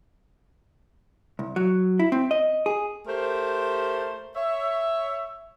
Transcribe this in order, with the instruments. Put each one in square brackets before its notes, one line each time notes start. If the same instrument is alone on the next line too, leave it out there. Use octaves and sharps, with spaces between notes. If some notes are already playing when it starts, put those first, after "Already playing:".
[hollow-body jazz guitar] C2
F#3
E4
C4
D#5
G#4
[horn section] A3 G4 A#4 C5
C#5 E5